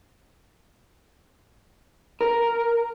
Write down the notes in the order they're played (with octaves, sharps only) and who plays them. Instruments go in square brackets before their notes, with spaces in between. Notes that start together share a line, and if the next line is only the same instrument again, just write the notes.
[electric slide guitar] A#4